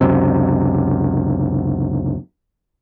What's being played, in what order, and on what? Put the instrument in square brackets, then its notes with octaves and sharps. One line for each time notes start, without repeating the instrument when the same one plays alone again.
[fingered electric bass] C#2 F#2 C3